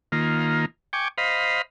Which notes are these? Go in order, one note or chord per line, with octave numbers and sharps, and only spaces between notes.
D#3 A#3 F4
G5 G#5 C#6 D6
C5 D#5 F5 B5